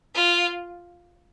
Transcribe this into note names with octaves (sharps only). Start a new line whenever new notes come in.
F4